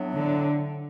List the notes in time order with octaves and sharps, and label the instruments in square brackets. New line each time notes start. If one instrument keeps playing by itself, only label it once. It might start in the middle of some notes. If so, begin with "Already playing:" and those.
Already playing: [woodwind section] A2 F#3 B3 D4
[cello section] D3